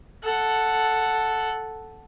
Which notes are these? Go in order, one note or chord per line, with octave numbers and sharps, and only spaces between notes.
A4 F#5